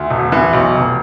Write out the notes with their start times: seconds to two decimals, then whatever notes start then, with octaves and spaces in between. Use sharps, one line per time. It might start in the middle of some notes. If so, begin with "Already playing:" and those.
Already playing: D2
0.11 E1
0.32 E3
0.53 B1
0.75 F1